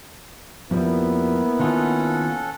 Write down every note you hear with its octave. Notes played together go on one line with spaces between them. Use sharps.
F2 F3 G3 A#3 B3 E4
D#3 C#4 F4 A4 F#5